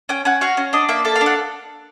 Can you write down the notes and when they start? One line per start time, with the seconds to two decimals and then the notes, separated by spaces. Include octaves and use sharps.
0.09 C#4 G5
0.25 C#4 F#5
0.41 F#4 F5
0.57 C#4
0.73 D4 D#5
0.89 A#3 E5
1.05 A4 E5
1.16 F5
1.21 D4
1.26 F#5